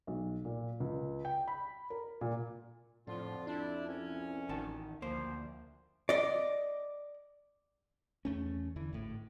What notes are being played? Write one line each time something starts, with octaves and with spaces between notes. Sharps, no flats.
B1
A#2
C#2
G5
B5
A#4
A#2
F2 A2 D3 F3 F4
D4 E4
C2 C#4
A1 D#3 F#4 A5
D2 F3 A#3 C5
D5 D#5
E2 A3 C#4
E2 D3 E3
G#1 A2